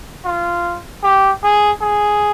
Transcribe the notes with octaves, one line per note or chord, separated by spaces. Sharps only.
F4
G4
G#4
G#4